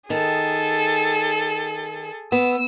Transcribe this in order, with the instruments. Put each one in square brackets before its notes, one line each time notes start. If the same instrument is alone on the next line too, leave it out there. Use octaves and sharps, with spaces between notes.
[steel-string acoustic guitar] D#3 [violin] G#4 A4
[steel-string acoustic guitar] B3 [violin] E6